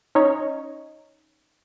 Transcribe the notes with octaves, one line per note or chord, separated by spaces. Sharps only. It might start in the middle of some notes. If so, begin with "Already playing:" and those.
C#4 D#4 C#5